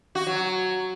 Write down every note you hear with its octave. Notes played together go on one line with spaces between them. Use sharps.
F#4
F#3